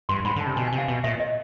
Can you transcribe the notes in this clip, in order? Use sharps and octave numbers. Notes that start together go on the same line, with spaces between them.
G2 C6
G#2 B5
D3
A5
C3
B2 G#5
G#5
C3
F5
B2 F5
A#2 E5
D#5